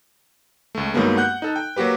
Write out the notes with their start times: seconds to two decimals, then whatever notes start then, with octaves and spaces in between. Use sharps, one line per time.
0.75 C#2 A3
0.94 G2 D#3 F#3 G#3 A#3 B3
1.17 F#5 F#6 G6
1.42 D#4 A4
1.56 G5
1.76 F#3 A#3 F#4 G4 B4